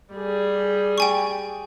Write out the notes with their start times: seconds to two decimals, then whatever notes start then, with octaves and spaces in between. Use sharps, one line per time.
0.14 G3 G#4
0.98 G5 G#5 C#6